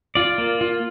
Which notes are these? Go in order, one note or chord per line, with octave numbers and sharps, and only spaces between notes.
F4 D5
A#3
F4